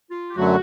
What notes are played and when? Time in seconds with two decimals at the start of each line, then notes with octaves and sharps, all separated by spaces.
0.11 F4
0.31 G4
0.37 F#2 D3 F#3 A3 F#4